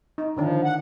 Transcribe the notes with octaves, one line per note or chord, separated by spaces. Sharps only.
D#4
D3 D#3 F3 D4
F#5